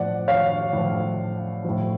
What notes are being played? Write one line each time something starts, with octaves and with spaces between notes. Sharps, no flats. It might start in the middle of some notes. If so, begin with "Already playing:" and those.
Already playing: A2 F3 D5 F#5
C#5 F5
A2 F3
A2 F3